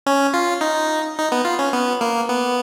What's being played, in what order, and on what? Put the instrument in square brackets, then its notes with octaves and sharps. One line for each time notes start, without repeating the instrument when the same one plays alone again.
[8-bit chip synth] C#4
F4
D#4
D#4
B3
F4
C#4
B3
A#3
B3